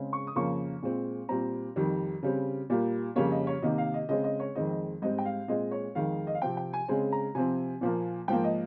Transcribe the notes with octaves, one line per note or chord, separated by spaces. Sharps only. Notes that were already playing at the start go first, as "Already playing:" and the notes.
Already playing: C#3 G#3 C4
C#6
D#6
F2 C#3 F3 A#3 C#6
A#2 G#3 C4
A#2 G3 C4 A#5
F2 D#3 G3
C#3 G3 C4
A#2 G3 A#3
F2 C#3 G3 A#3 C#5
D#5
C#5
C3 D#3 A#3 D#5
F5
D#5
C#3 G#3 C4 D#5
D#5
C#5
F2 D#3 G#3 C4 D#5
D#5
G#2 G3 C4 D#5
G5
F5
A#2 G#3 C4 D#5
C#5
F2 D#3 G#3 F5
D#5
F5
C3 F3 C4 G5
G5
G#5
C#3 G#3 C4 G#5
A#5
C3 F3 C4 G#5
A#2 F3 A#3
G#2 F3 A#3 G5
D#5